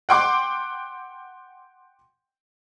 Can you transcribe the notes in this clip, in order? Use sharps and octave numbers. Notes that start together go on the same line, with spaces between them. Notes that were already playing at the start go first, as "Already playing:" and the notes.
F#5 G5 C6 D6